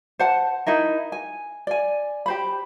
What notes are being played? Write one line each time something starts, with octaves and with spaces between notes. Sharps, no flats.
C5 F#5 A5
D#4 E4 A#4
G#5
D5 G#5
G4 C5 B5